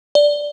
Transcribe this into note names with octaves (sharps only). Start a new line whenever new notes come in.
D5